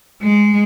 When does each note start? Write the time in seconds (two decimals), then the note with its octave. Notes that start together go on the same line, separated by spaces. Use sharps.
0.23 G#3